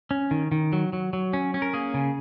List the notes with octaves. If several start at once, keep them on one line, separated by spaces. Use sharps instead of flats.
C#4
D#3
D#3
F#3
F#3
F#3
C#4
C#4
A#4
A#3 G#4
C#3